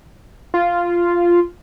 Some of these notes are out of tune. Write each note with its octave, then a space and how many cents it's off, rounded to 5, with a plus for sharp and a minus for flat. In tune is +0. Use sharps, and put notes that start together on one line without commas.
F4 -5